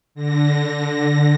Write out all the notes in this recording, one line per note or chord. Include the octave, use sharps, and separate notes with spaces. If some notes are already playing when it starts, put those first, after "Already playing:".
D3 A#6